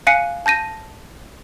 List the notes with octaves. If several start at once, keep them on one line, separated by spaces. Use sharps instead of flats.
F5 G#5 F#6 C7 C#7 D#7
A5 G6 A#6 D#7